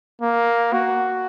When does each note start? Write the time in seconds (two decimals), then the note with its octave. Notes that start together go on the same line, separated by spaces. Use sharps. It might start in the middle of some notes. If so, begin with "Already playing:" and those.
0.21 A#3
0.73 F#4